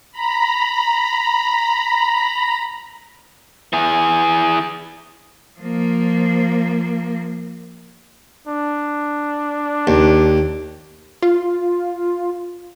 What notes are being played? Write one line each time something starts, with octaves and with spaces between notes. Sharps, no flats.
A#5 B5
E3 G#4
F3 A#3
D4
D#2
F4